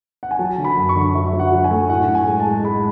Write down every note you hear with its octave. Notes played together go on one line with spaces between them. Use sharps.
F#5
G#5
F#3 A5
D3
B5
F#2
C#6
D3
F#3 E5
F#3
F#5
F#3
G#5
A3
A2 F#5
A2
G#5
G#3
A5
G#3
G#3 B5